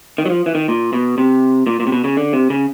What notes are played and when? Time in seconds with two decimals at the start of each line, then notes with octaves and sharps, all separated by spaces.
0.18 D#3
0.25 F#3
0.30 F3
0.46 E3
0.55 D#3
0.68 A#2
0.93 B2
1.18 C3
1.67 A#2
1.80 A#2
1.87 C3
1.92 B2
2.04 C#3
2.17 D3
2.33 C3
2.50 C#3